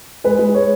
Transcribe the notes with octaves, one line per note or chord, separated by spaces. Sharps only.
G#3 B4
G#3
C#5